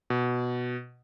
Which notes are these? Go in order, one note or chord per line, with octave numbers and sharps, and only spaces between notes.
B2